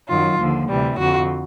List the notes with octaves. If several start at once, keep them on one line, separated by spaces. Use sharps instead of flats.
F#2 D#3 F#3 F4
D#2 D3 F3
D2 C3 E3 G3
F2 D3 F3 F#4